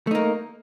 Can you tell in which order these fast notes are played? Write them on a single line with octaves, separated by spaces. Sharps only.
A3 D#4 A#3